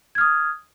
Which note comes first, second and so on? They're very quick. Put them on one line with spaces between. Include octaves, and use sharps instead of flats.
G#6 F6 D#6